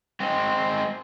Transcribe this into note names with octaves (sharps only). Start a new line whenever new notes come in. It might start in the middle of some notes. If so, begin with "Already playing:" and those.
G#3 C4